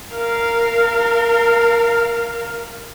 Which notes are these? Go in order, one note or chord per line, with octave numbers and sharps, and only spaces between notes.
A#4 F5